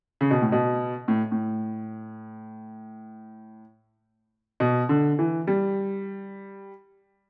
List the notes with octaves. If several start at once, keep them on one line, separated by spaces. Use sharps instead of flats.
C#3
B2
A2
B2
A2
A2
B2
D3
E3
G3